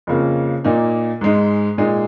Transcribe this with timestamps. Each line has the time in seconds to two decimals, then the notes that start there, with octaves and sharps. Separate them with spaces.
0.07 F2 C#3 A#3 F4
0.64 A#2 A#3 D#4
1.21 G#2 G#3 D#4
1.78 A#2 G#3 D#4